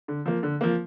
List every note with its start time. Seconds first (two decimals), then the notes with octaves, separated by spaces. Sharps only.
0.08 D3
0.26 F3 A#3
0.43 D3
0.61 F3 A#3